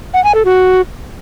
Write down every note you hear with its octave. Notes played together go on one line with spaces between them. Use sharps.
F#5
G#5
A4
F#4